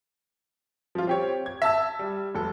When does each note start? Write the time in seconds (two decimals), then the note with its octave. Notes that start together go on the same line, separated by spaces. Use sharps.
0.95 F3 F4
1.07 C4 G4 C#5
1.46 G#6
1.62 E5 A5 E6
1.99 G3
2.35 F1 A4